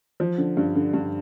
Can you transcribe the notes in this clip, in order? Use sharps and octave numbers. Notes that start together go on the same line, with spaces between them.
F3
D3
G2
D3
G2